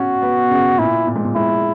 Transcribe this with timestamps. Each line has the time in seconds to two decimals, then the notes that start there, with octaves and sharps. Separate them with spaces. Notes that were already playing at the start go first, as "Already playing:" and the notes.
Already playing: C#4 F#4
0.22 B3
0.50 C#3
0.79 A#2 E4
1.07 A#2
1.16 G#2
1.25 A#2
1.35 G#2 E4